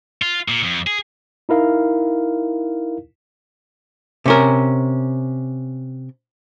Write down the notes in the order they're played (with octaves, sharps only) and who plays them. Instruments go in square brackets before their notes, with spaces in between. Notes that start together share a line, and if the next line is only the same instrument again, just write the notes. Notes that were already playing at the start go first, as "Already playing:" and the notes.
[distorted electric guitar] F4
A#2
F2
G#4
[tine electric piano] D#4 E4 A#4 F5
[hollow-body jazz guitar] C3 C#4 A#4